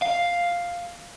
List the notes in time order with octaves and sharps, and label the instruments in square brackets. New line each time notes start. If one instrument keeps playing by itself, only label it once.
[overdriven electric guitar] F5